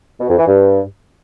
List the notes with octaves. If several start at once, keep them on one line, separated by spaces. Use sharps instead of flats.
B2
F2
E3
G2